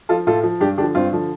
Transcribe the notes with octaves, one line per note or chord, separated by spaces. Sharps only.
F3 F4 A4
A2 F4 A4
F3
G2 D4 G4
D3 F3 D4 G4
G2 C4 F4
D3 F3